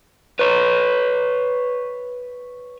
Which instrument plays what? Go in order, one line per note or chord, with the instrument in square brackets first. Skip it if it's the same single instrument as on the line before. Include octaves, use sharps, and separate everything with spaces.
[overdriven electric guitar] B4 C#5